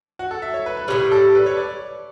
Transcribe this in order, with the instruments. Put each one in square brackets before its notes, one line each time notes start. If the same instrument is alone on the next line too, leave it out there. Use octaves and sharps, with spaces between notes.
[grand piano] F#4
A4
E5
C#5
B4
B4
[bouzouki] G3 [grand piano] C#5
[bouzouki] A2 E3
[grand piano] A4
B4
C#5
D5